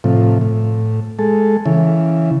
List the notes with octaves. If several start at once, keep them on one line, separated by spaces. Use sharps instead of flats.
A2 C3 F3
A2
G#3 A4
C#3 E3